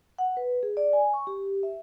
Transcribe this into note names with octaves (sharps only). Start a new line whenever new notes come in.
F#5
B4
G#4
D5
G#5
C#6
G4
E5